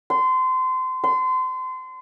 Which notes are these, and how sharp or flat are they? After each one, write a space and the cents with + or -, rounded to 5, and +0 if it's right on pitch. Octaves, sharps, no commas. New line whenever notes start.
C6 -25
C6 -30